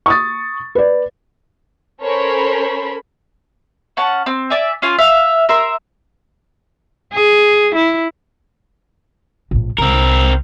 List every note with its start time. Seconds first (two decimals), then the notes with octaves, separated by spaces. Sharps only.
0.06 C#6 D#6 A6
0.75 B4 D5
2.01 C#4 A4 A#4 C5 C#5 B5
3.97 C#4 F#5 A5
4.26 C4
4.50 D5 E5 G#5
4.82 C#4 F4 G#5
4.99 E5 F5
5.49 A#4 E5 C6
7.13 G#4
7.75 E4
9.51 A#1 A2
9.78 C2 C4 A#4